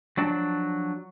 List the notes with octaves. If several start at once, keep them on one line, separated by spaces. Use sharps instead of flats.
F3 F#3 D4 D5 A5